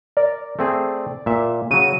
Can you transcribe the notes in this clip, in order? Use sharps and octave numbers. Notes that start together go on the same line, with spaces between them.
A#4 D5
A3 C4 G#4
A#2 E5
C#3 F#3 D#7